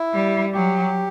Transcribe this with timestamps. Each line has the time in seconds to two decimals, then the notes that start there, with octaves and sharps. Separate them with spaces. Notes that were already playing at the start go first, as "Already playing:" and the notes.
Already playing: E4
0.13 G3
0.54 F#3 G4